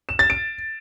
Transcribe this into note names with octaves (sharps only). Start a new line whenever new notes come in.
E7
A6
D7